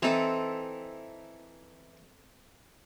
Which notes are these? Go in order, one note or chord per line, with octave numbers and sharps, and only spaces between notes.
E3 C4 D#4 A4